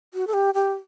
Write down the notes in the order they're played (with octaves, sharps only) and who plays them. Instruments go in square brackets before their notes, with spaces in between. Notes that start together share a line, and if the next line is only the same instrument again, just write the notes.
[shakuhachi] F#4
A4
G4
G4